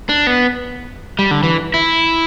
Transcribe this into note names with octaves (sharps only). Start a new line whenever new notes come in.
D4
B3
G3
D3
E3
E4